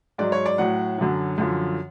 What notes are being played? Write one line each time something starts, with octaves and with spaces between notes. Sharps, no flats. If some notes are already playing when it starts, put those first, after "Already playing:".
G#2 F#3 D5
C#5
D5
A2 F#3 F#5
F#2 D3 F#3
F#2 D3 F3